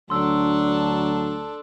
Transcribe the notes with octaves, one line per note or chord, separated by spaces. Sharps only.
D2 F#3 D4 A4 C6 E6